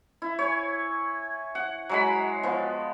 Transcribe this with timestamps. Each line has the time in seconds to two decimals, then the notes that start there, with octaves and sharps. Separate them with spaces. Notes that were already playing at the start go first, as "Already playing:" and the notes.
0.22 E4
0.39 C#5 G#5
1.55 F#5
1.89 F#3 G#3 B5
2.43 F3 B3